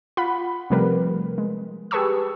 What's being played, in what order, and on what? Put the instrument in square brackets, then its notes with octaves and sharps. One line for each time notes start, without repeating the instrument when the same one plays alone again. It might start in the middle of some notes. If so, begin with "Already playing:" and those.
[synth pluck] F4 F#5 B5
C3 F3 G3 A3 A#4 B4
G#3
G4 G#4 B4 A5 C#6 E6